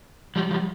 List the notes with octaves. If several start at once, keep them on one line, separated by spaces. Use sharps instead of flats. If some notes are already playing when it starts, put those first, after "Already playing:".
F3 G3
F3 G3